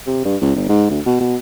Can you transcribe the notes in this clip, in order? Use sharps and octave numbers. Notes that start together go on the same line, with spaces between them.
C3
G2
C#2
G1
G#2
D2
B2
B2